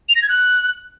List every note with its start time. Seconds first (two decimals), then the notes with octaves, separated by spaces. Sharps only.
0.09 F7
0.16 A#6
0.22 G#6
0.29 F#6